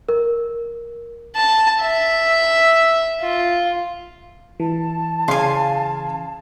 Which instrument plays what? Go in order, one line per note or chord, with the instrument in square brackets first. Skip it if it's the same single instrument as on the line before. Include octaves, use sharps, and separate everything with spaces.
[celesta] A#4
[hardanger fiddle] A5
E5
F4
[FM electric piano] E3 [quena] A5
[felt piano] C#3 C6 [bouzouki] F5 G#5